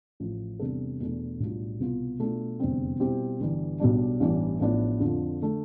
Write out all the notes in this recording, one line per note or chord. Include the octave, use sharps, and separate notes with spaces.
A1 A2 F3
E2 C3 G3 D4 A4
E2 B2 A3 D4
B1 A2 G3 D4 F4
C2 B2 B3 F4
B2 A3 D4 F4
F1 E2 D3 G3 C4
B2 G3 C4 E4 G4
G1 G2 E3 G3
B1 B2 G3 D4
A1 G2 E3 B3 D4
A1 A2 F3 B3 D4
F2 D3 F3
D3 A3